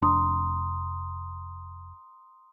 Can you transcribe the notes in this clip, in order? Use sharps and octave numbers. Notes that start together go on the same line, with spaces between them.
F1 D4 A#5 C6 D#6